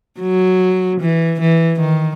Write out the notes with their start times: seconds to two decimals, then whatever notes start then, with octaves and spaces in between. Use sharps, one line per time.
0.21 F#3
1.00 E3
1.41 E3
1.80 D#3